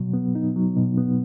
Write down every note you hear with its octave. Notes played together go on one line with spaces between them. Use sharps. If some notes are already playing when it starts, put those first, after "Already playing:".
Already playing: B2 F#3
B3
D#4
F#3
B2
B3